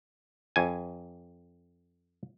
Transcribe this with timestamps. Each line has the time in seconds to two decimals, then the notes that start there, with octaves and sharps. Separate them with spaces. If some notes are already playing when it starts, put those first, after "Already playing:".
0.56 F2 G#5